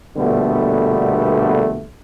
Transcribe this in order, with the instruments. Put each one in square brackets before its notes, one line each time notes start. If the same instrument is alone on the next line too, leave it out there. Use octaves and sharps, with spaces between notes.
[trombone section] A#1 B2 D3 G3 A3 B3